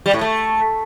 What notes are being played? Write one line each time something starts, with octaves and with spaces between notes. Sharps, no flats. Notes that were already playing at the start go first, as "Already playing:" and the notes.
G3
A2
A3